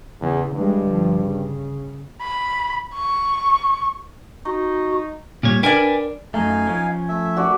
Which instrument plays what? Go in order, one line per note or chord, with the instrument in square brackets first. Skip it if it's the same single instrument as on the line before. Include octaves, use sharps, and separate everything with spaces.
[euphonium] E2 [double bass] C#3
[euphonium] G2 [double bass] E3 G#3
[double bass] G1 F3
C#3
[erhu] B5
C#6
[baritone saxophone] D#4 [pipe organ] F#4
[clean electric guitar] A#2 G3 C#5
[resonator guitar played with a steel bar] D4 A#4 D5 [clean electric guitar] B4 G5 G#5
[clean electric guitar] F#2 A3 [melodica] D#4 F5 G#5
[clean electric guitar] F3 C#4
[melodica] A3 E5
[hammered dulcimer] F#4 D5